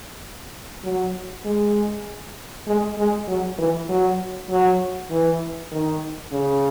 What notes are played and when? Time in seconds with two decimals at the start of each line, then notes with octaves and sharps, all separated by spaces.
0.84 F#3
1.45 G#3
2.67 G#3
2.98 G#3
3.27 F#3
3.58 E3
3.89 F#3
4.49 F#3
5.10 E3
5.71 D#3
6.32 C#3